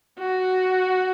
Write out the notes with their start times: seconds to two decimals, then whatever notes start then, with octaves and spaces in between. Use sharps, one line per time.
0.19 F#4